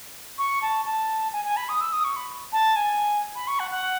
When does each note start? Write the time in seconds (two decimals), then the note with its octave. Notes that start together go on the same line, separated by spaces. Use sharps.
0.38 C#6
0.61 A5
0.85 A5
1.32 G#5
1.45 G#5
1.56 B5
1.68 D#6
1.80 E6
1.92 D#6
2.04 C#6
2.16 B5
2.52 A5
2.75 G#5
3.35 B5
3.47 C#6
3.59 F#5
3.70 F#5